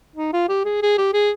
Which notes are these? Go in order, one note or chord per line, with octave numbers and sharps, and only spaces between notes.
D#4
F4
G4
G#4
G#4
G4
G#4